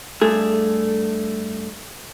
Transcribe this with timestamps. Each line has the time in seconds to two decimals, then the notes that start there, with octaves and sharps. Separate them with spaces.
0.22 G2 A3 G#4